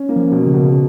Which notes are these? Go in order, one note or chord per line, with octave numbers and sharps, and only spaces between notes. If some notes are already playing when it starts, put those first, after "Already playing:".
Already playing: C#4
A#3
F3
B2
C#3
B2
C#3